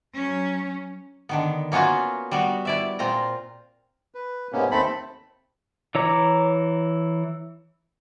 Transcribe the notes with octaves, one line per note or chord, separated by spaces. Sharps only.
F#3 C#4
D3 D#3 B3
A#3 B3 C#4 F4 F#4
G3 B3 F#4
E4 D5 E5
A#2 C4 F4 A#5
B4
G#2 C3 A#3 B3 C#4
D#2 A3 C4 A4 B5
E3 C#5 A#5 D6